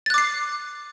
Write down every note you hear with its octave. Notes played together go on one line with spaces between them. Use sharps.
D6 F#6 A6 C7